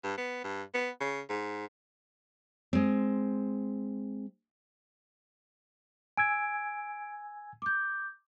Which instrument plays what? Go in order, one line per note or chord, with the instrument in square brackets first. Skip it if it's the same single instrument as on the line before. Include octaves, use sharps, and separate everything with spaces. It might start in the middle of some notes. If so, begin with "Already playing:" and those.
[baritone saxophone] G2
B3
G2
B3
C#3
G#2
[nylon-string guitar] G#3 C4
[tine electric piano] G#5 E6 G#6 [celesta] D7
[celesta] D6 G6